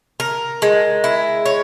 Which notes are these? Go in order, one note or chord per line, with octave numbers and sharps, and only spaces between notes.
A#4
G#3
E4
C#5